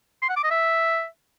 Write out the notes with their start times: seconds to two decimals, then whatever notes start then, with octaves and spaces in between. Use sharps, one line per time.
0.22 C6
0.29 F#5
0.36 D6
0.44 D#5
0.51 E5